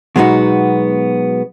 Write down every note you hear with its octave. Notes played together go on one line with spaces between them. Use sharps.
B2 F#3 G#3 B3 D#4 F#4